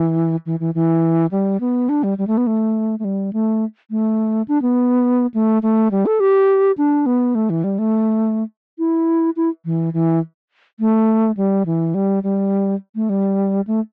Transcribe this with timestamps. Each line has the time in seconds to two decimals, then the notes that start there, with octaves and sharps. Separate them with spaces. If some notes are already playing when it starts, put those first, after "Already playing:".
Already playing: E3
0.46 E3
0.60 E3
0.75 E3
1.31 G3
1.60 B3
1.89 D4
2.03 G3
2.18 G3
2.27 A3
2.37 B3
2.47 A3
2.99 A3
3.04 G3
3.33 A3
3.91 A3
4.48 D4
4.62 B3
5.34 A3
5.63 A3
5.91 G3
6.06 A4
6.20 G4
6.78 D4
7.06 B3
7.35 A3
7.50 E3
7.64 G3
7.79 A3
8.79 E4
9.36 E4
9.65 E3
9.93 E3
10.80 A3
11.37 G3
11.66 E3
11.94 G3
12.23 G3
12.95 A3
13.09 G3
13.67 A3